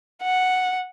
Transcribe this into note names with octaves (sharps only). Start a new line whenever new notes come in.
F#5